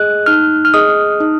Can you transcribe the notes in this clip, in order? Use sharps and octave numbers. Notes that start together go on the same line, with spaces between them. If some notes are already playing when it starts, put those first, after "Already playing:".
Already playing: G#4 D#5 F#6
D#4 F6
F6
G#4 D#5 D#6
D#4